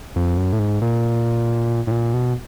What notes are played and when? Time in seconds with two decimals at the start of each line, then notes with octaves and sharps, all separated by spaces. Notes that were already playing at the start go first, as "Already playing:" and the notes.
0.16 F2
0.38 F#2
0.53 A2
0.59 G#2
0.82 A#2
1.87 A2
1.91 A#2
2.14 B2